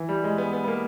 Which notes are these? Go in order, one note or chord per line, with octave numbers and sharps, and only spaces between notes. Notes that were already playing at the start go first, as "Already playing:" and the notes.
Already playing: E3
G3
G#3
B3
B3
B3
A#3